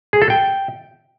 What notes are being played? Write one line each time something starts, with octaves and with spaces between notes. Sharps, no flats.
G#4
A4
G5